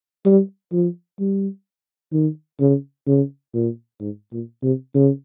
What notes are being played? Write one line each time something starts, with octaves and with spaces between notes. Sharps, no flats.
G3
F3
G3
D#3
C#3
C#3
A#2
G#2
A#2
C3
C#3